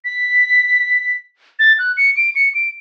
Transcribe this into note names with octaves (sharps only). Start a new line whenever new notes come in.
B6
A6
F#6
C#7
D7
C#7
D7